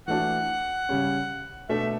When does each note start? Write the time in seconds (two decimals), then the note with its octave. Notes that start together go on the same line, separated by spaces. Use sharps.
0.08 E3 A3 D4 F#4 F#5
0.89 C#3 G3 C#4
1.69 B2 A3 D4 A4 E5